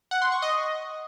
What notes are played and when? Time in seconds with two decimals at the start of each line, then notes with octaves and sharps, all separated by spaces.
0.11 F#5
0.22 C6
0.32 C#6
0.42 D#5